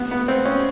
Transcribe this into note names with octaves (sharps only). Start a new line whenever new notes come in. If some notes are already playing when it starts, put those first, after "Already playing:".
Already playing: B3
B3
C4
C#4